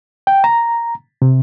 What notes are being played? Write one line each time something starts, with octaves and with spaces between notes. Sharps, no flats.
G5
A#5
C3